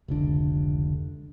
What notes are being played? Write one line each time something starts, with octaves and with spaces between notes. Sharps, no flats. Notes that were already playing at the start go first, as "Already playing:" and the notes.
F1 C#2 D3